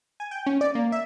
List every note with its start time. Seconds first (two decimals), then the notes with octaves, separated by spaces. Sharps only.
0.20 G#5
0.31 G5
0.47 C#4
0.61 D5
0.75 A#3
0.92 E5